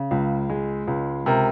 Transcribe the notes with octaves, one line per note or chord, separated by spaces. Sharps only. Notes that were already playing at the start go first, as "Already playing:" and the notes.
Already playing: C#3
C#2
G#3
C#2
C3 A#4